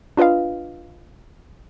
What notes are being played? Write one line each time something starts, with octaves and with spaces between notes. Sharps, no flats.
D4 F4 B4 D#5 F5